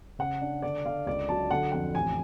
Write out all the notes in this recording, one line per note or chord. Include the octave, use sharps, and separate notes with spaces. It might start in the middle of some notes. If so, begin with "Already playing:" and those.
C#3 F#5
D4
D3 D5
D3 F5
C#2 D5
F#3 A5
D3 F#5
F2 F#5
A1 G#5